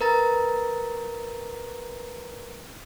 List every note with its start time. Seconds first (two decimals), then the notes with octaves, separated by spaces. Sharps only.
0.01 A#4 B4 A#5 A6